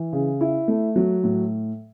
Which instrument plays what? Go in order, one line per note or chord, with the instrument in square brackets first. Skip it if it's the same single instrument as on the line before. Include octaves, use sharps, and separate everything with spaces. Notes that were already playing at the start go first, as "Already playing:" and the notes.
Already playing: [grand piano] E3
C#3
E4
A3
F#3
A2